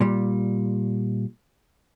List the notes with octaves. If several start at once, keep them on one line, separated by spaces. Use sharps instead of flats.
A#2 G3